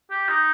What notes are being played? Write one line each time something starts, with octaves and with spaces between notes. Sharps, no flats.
G4
D#4